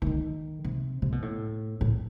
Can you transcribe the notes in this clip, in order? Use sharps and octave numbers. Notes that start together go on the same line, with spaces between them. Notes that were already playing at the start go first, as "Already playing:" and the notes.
E3
D#3
C3
C3
B2
A2
A2